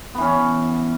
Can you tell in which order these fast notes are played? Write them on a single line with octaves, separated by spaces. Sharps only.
B3 E3 C#4